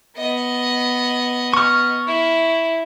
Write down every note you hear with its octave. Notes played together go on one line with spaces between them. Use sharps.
B3 D#5
C#6 F6
E4